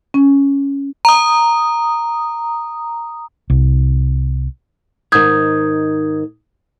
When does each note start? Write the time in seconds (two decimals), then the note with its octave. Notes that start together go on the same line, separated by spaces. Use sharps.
0.14 C#4
1.05 A#5 D#6
3.50 C2
5.12 G#2 D#3 D#6 G6 G#6